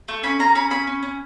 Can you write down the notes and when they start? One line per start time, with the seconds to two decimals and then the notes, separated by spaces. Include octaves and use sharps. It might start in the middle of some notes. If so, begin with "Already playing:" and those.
0.08 A3
0.23 C#4 B5
0.39 C#4 A#5
0.55 C#4 B5
0.70 C#4 B5
0.87 C#4
1.03 C#4